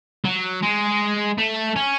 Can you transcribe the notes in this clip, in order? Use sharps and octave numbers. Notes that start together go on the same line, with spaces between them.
F#3
G#3
A3
C#4